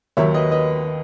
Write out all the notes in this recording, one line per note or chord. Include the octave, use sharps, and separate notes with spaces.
D#2 D#3 F#3 C#5 E5
B4 D#5
B4 D#5